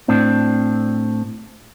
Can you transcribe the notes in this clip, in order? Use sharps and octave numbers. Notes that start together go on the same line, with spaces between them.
A2 C4 D4